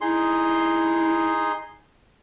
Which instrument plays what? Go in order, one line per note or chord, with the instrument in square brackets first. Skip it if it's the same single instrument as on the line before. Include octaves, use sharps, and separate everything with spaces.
[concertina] D#4 G#4 C6 [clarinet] E4